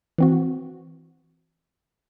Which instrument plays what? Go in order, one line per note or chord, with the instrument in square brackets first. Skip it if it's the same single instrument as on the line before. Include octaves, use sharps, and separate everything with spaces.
[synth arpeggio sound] E3 C4 F#4